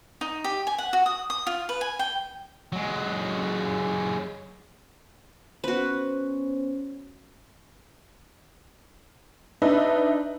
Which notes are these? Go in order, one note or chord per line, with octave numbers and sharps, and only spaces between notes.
D#4
G4
G#5
F#5
F#4
D#6
D#6
F4
B4
G#5
G5
F#3 G#3
B3 C#4 F#4 B4 C5
D4 D#4 B4 E5